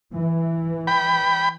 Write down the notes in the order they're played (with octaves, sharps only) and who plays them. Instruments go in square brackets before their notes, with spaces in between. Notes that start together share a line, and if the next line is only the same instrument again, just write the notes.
[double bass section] E3
[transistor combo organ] G5 B5